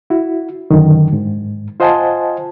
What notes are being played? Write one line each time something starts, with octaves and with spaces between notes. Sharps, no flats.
E4 F#4
F#2 D3 D#3
G#2
F4 C5 D#5 F#5 G#5 A5